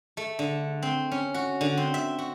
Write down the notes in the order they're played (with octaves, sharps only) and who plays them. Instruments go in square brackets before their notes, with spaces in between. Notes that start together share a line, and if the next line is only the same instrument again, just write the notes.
[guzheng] A3
D3
C4
C#4
F#4
D3
C4
E5
F#4